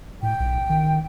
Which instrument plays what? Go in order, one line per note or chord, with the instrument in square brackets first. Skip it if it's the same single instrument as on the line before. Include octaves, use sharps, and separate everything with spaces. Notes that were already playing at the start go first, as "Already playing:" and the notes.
[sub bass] A2 [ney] G5
[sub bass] B1
D#3